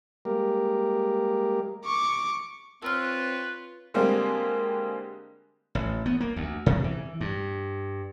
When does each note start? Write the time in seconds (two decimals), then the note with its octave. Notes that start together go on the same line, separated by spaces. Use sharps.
0.25 G3 G#3 A#3 G4 A#4
1.85 C#6 D6
2.82 C4 F4 B4 C#5 E6 F6
3.94 D3 G3 G#3 A#3 C4
5.75 A1
6.06 B3
6.21 A#3
6.36 D2
6.66 C3
6.84 E3
7.21 G2